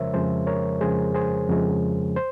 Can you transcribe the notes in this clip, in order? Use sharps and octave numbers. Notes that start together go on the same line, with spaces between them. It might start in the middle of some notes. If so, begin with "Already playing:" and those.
Already playing: F2 C#3 F3 G#3 A#4 C5 C#5 E5
F2 C#3 F3 G#3 G#4 C5
A#4 C#5
F2 C#3 F3 G#3 G#4 C5
G#4 C5
F2 C#3 F3 G#3
C5